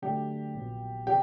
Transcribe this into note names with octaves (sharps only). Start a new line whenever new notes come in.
D3 F#3 A3 D4 G4
A#1 A#2 F#3 B3
C#3 F#3 B3 G4